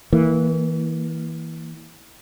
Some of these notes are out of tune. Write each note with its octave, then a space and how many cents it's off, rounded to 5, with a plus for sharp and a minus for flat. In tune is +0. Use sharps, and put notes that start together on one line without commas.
E3 -25 A#3 +0